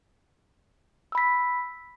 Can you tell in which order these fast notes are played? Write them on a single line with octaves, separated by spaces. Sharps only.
E6 B5 B6